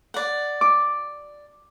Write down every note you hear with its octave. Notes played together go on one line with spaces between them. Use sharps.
D5 F#5
D6